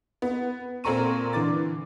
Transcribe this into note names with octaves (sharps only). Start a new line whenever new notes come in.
B3
A#2 C4 A4 A#5 C#6 D#7
D3 E3 D6 A6